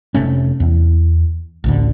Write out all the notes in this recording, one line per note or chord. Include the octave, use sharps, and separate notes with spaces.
F1 C3 A3 C#4
E2
A1 D2 D3